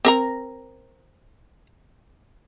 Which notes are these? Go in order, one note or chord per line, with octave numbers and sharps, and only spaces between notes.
C4 A#4 A#5